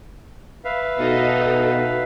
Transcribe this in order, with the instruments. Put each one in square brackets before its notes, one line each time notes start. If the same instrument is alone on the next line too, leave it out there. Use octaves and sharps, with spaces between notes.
[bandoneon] B4 E5 F5
[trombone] B2 [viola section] D#4 A4